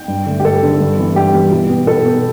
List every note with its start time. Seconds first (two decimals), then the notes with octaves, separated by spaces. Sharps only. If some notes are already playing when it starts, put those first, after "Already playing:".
Already playing: G5
0.08 G2
0.26 D3 A3
0.40 G4
0.45 G2 A4
0.62 D3 A3
0.80 G2
0.99 E3 G3 B3
1.15 G2 G4
1.34 E3 G3 B3
1.51 B2
1.69 B3
1.87 B2 A4
2.05 B3